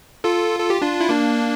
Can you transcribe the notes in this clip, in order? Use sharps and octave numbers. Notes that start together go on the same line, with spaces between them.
F4 A4
A4
G4
D4 F4
E4
A#3 D4